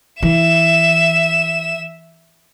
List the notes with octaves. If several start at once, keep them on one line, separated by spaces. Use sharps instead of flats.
E3 E5 E7